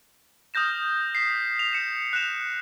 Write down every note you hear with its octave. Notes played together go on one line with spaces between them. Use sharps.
D#6 F6 G6 A#6 E7
B6 C7
F7
C#7 E7
F#6 A#6 E7 F7